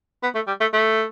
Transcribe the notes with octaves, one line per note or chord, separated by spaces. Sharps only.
B3
A3
G3
A3
A3